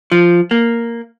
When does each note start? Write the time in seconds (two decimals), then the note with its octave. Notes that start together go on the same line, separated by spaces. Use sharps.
0.12 F3
0.51 A#3